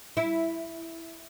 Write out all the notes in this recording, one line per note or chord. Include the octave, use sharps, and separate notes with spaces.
E4